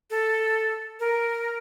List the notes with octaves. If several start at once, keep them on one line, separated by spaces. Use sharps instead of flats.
A4
A#4